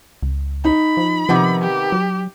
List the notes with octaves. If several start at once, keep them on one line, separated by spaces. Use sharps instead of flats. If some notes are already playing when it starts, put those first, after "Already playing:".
C#2
D#4 B5
F3
C3 D#3 F3 B3
G4
F#3